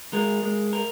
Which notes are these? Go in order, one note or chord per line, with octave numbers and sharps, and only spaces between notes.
G#3 A#4
G#3
A#4